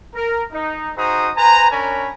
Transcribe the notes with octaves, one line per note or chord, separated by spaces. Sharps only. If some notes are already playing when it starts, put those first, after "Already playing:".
A#4
D#4
D#4 F#4 G#4 C5 A#5 D#6
B4 C5 G#5 A#5
C#4 D4 A#4 C#5 G#5 B5